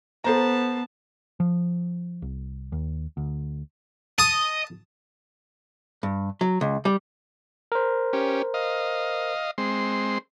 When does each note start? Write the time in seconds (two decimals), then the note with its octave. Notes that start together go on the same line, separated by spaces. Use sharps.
0.24 B3 A4 C5 A5 A#5
1.40 F3
2.22 C2
2.72 D#2
3.17 D2
4.18 D#5 A5 D#6
6.03 G2
6.41 F#3
6.61 C#2
6.85 G3
7.72 A#4 C5
8.13 C#4 G4
8.54 D#5 F5
9.58 G#3 C4 C6